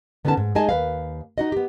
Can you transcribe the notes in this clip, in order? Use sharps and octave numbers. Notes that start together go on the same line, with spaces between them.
D3 B3 C#4 D#4 B4 A5
G#2
G#3 D#4 G#4 D#5 G#5 A5
D#2 B4 F5
D#4 F#4 D#5
B3 G4